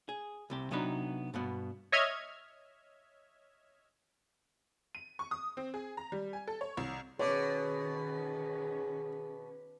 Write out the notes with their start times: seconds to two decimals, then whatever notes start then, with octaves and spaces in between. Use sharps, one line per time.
0.09 G#4
0.50 C2 C3 G4
0.71 C3 F#3 B3 D4 D#4 B4
1.34 G2 B2 B3
1.92 C#5 D#5 E5 F6 G#6
4.95 D#7
5.19 C#6
5.31 D#6
5.57 C4
5.74 G#4
5.97 A#5
6.12 G3
6.33 G#5
6.47 A4
6.61 C#5
6.77 C2
7.19 B2 D#3 C#4 G#4 B4 C#5 D6